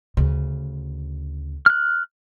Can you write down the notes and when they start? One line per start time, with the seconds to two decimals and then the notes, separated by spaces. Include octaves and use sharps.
0.17 D2 C#3
1.66 F6 F#6